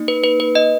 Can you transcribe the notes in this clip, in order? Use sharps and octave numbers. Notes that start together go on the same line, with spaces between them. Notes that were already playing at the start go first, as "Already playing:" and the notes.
Already playing: A#3 D#4
B4
B4
B4
D#5